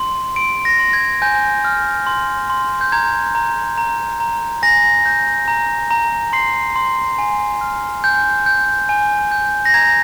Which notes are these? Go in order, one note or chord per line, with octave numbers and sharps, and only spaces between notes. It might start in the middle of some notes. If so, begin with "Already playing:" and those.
Already playing: C6
C6 D7
A#6
C6
G#6
G#5 G6
F6
C6
C6
G6
A#5 G#6
A#5
A#5
A#5
G#5 A#6
G6
A#5
A#5
C6 C7
C6
G#5
F6
G#5 G6
G6
G#5
G6
A#6
A#5 G#6